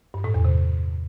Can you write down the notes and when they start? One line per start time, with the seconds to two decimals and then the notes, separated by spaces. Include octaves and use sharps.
0.14 G2
0.24 A2
0.34 E2
0.45 C3